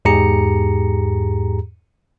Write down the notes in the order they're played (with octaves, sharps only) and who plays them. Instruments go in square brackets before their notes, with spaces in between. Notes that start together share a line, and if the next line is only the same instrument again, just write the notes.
[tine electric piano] E2 G#2 G4 G#4 A#5 C#7